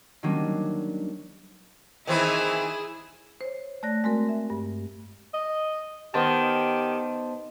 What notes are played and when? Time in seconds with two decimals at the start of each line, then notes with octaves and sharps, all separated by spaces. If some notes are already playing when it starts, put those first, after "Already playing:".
0.23 D#3 F#3 G3 A#3 C#4 D4
2.07 D#3 E3 C4 E4 G#4
3.41 C5 C#5
3.83 A3 D5 F#6 A#6
4.04 G#3 A3 C4 F#4 A#4
4.29 E5
4.50 G2
5.34 D#5
6.14 D#3 B3 G4 C5 A5